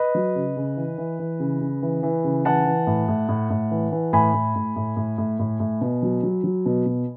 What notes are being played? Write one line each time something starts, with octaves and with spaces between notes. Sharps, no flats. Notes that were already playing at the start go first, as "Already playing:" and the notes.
Already playing: B4 D#5
F#3
C#3
C#3
E3
E3
E3
C#3
C#3
E3
E3
C#3
E3 F#5 A5
E3
A2
A2
A2
A2
E3
E3
A2 G#5 B5
A2
A2
A2
A2
A2
A2
A2
B2
F#3
F#3
F#3
B2
B2